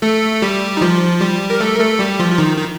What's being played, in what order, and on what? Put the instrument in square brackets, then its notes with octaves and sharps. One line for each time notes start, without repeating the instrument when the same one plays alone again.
[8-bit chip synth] A3 A4
G3 G4
D#4
F3 F4
G3 G4
A#4
A3 A4
A#4
A3 A4
G3 G4
F3 F4
F4
D#3 D#4
D#4